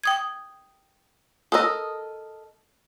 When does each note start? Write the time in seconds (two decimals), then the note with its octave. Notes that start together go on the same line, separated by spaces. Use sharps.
0.04 G5 D#6 G#6
1.52 A4 A#4 D#5 D#6 E6